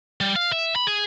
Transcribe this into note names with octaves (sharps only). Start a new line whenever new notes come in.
G3
F5
E5
B5
G#4